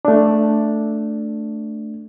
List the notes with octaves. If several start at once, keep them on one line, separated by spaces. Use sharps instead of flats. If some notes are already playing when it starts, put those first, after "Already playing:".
A3 D4